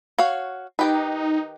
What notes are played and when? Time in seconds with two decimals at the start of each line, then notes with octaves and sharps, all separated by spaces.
0.18 F#4 C#5 F5
0.79 D#3 D#4 G4 B4